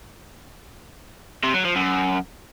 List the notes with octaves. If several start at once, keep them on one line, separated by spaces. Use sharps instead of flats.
C3
F#3
F3
F#2